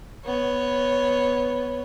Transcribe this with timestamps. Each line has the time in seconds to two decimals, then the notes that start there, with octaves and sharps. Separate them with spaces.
0.25 B3 C#5